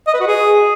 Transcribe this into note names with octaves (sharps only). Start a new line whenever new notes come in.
D#5
B4
F#4
G#4